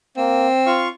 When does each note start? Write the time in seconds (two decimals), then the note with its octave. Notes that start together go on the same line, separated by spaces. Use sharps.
0.17 A#3 C4
0.66 F4 F5 C#6